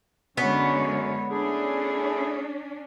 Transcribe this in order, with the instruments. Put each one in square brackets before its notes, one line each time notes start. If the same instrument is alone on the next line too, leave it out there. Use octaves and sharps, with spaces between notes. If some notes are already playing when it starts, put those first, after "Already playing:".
[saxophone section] F#2 C#4 [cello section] D3 G#3 C#5 [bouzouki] B3
[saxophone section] A3 E4 G#4 [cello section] C#4 D4